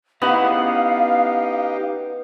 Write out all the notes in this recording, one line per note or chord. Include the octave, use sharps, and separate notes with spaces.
B3 C#4 D#4 E4 G4 F5 B5